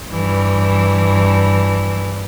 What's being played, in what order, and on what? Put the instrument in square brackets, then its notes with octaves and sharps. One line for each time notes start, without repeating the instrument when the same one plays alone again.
[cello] G2 E3